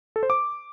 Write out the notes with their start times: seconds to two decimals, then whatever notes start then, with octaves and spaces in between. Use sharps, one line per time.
0.16 A4
0.23 C5
0.30 D6